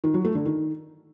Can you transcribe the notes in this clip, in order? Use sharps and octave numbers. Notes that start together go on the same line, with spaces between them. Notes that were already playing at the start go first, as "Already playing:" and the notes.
D#3
F#3
A3
D3
D#3